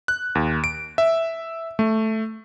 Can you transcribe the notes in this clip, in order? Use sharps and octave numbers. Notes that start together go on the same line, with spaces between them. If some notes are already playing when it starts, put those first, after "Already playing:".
F#6
D#2
D7
E5
A3